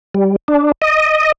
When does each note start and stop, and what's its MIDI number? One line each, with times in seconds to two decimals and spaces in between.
0.14 0.36 55
0.48 0.72 62
0.82 1.32 75